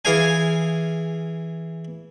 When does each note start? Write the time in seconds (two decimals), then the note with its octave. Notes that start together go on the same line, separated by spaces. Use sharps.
0.05 E3 G#4 F5 G#5